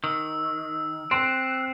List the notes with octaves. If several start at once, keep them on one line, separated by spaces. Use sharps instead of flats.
D#3 E6
C4 C6 F#6